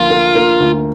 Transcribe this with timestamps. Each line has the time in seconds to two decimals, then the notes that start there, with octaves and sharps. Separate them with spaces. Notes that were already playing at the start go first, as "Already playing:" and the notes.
Already playing: D2 F3 A#3 F4
0.10 A#3
0.35 A#3
0.60 D2